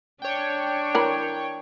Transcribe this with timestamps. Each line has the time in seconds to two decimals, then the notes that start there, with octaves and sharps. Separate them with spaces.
0.22 D4 C#5 G5
0.95 E3 A#4 B5